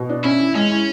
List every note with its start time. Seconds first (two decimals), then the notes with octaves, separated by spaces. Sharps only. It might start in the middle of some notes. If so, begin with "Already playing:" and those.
Already playing: B2
0.09 D4
0.24 C#4 E4
0.39 E3
0.55 G#3 C#4
0.70 E4